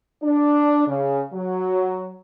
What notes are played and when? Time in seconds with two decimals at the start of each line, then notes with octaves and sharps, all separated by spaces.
0.22 D4
0.87 C#3
1.33 F#3